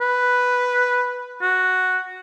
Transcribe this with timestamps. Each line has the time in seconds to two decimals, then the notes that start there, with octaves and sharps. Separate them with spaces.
0.01 B4
1.42 F#4